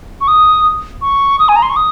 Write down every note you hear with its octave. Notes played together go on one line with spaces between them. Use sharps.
C#6
D#6
C#6
D#6
G#5
A#5
C6
C#6
D#6